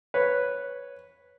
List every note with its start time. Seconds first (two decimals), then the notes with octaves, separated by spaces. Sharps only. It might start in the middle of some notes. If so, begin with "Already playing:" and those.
0.14 B4 C#5